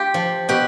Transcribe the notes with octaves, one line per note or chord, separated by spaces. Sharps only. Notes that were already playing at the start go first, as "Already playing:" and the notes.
Already playing: F4 G4
F3
B2 G4